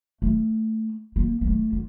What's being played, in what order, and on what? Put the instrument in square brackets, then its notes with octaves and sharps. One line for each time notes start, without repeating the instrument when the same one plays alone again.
[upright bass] A3
A#3
A#3
A3
D3